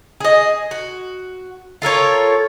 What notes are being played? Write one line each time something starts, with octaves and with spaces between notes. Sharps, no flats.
G#4 D#5
F#4
F4 A4 A#4 C#5